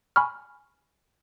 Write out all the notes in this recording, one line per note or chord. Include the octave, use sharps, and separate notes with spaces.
G#5 B5 C#6 F6